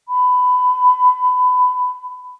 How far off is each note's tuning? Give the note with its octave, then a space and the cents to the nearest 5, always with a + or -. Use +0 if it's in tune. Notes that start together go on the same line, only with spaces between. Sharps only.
B5 +20